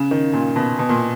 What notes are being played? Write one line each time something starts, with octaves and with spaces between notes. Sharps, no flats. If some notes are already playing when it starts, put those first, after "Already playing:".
Already playing: C#3
D#3
A#2
B2
B2
A#2